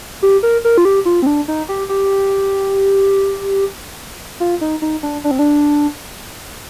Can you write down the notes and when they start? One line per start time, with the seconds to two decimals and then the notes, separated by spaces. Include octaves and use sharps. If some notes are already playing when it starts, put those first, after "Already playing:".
0.22 G4
0.43 A#4
0.65 A#4
0.78 F4
0.85 G4
1.05 F4
1.22 C4
1.26 D4
1.48 D#4
1.69 G4
1.89 G4
4.40 F4
4.61 D#4
4.82 D#4
5.03 D4
5.24 D4
5.31 C4
5.39 D4